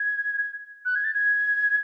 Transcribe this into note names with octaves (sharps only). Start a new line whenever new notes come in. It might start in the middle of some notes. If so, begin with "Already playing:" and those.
Already playing: G#6
F#6
G#6
A6
G#6